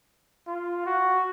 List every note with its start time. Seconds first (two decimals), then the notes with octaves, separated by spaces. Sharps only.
0.47 F4
0.86 F#4